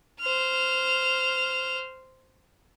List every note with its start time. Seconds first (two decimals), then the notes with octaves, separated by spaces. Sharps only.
0.20 C5 F6